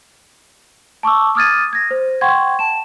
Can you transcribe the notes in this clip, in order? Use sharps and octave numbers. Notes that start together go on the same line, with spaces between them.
A5 C#6 D6 E6
D6 D#6 F6 G#6 A6 D#7
G#6 A#6
C5
F#5 G5 C6 C#6 G#6
A5 E7